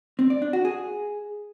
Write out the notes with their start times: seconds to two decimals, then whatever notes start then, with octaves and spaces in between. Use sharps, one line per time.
0.19 C4
0.30 D5
0.42 D4
0.53 F#4
0.65 G#4